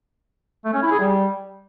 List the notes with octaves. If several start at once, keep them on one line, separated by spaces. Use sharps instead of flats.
A3
C#4
E4
G#4
G3